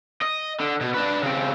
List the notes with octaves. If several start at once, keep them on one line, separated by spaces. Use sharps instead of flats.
D#5
D3
B2
D4 B4
C#3 C4